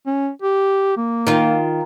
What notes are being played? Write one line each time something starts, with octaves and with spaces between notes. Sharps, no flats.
C#4
G4
A#3
D#3 F4